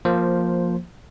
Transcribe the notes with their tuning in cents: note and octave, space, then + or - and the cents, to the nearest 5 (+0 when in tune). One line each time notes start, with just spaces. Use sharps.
F3 +10 A#3 +0 C5 +0